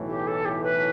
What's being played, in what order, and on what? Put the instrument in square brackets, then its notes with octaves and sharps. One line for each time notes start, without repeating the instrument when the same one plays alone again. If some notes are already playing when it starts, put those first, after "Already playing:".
Already playing: [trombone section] B1 A2 E3 A3
[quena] G4
A4
G4
B4